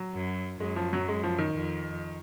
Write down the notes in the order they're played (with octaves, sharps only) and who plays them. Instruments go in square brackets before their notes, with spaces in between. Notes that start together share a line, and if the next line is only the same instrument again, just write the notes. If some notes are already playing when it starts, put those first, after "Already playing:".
Already playing: [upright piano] F#3
[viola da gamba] F#2
[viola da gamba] F#2 [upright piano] G#3
[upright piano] F3
F#3
G#3
F3
D#3
[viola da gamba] F2